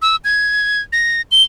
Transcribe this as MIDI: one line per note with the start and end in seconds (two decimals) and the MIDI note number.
0.02 0.16 88
0.25 0.82 92
0.93 1.22 94
1.32 1.43 103